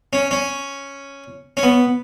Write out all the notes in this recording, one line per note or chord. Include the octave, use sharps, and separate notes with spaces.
C#4
C#4
C#4
B3